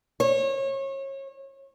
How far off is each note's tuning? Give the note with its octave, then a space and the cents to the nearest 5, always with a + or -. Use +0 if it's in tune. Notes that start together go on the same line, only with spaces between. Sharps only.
C#5 -30